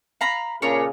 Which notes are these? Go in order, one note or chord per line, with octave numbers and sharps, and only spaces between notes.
F5 A#5 B5
A#2 C#3 D4 A#4 C#5